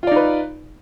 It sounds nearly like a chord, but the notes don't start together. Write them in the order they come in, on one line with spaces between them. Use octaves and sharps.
F4 D5 D#4 B4